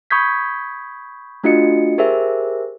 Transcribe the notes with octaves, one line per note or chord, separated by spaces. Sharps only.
B5 C#6 D#6 G6 G#6 B6
A3 D4 F4 F#4 D#5 C#7
G4 G#4 A#4 C5 E5